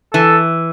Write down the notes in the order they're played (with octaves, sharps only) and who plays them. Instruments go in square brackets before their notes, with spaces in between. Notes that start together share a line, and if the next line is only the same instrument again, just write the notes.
[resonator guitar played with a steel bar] E3 [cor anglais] A4